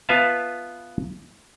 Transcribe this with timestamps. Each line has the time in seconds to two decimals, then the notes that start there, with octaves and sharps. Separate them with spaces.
0.09 B3 F4 B4 E5 F5 A5